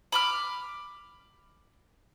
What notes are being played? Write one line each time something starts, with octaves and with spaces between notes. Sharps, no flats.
B5 D6 F6